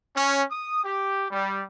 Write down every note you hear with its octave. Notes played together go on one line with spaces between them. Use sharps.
C#4
D#6
G4
G3